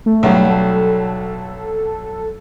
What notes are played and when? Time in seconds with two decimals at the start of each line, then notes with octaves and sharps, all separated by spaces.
0.06 A3
0.23 B1 F#3 G3
0.49 A4